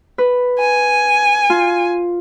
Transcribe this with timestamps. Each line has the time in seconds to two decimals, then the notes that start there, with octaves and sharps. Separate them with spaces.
0.18 B4
0.59 G#5
1.50 F4